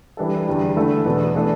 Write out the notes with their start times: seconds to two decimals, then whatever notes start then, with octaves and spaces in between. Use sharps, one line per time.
0.17 E3 G3 D4 A4
0.47 E2 D3 G3 D4
0.76 D3 A3 E4 A4
1.05 E2 B2 B3 D4
1.35 E3 A3 D4 A4